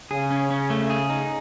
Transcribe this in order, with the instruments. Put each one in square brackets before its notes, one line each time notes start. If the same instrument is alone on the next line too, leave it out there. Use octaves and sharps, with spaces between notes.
[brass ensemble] C#3 [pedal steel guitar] G#4
[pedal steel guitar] C#4
C#4
A3
G#4
D#4